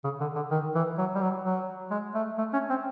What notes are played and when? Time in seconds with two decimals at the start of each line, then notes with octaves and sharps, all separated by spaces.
0.04 C#3
0.21 D3
0.36 D3
0.51 D#3
0.75 E3
0.98 F#3
1.15 G3
1.22 F#3
1.44 F#3
1.91 G#3
2.15 A3
2.38 A3
2.53 C#4
2.70 C4